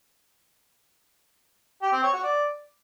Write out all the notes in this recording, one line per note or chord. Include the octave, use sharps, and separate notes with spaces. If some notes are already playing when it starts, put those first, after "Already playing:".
G4
C4
C#5
F#4
D5